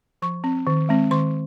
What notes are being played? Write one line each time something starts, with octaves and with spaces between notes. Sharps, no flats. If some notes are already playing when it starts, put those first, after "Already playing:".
F3 C#6
C4
D#3
G#3 C4
D#3 C6